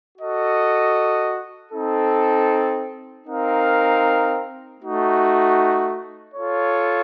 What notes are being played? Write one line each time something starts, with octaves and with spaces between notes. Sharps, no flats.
F#4 A4 D#5
C4 D#4 A4
C4 D#4 A#4 F5
A3 D#4 F#4
F4 A4 C#5